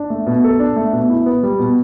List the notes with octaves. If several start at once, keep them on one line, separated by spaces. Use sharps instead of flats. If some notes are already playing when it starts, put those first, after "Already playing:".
Already playing: D4
A3
B2
A4
D4
A3
B2
E4
B3
G3
B2